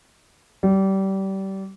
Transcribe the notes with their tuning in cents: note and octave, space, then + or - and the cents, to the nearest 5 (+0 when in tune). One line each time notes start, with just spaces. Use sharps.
G3 -25